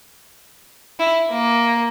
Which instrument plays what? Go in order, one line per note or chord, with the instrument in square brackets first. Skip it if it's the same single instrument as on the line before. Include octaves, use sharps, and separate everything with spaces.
[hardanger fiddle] E4
A#3